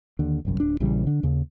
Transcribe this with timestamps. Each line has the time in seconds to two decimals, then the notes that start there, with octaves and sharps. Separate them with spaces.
0.19 D#2 D3
0.45 G1 C2 F#2
0.60 D1 D4
0.80 A#1 C#3 E3 G3
1.07 D3 D4
1.23 D#2 C#3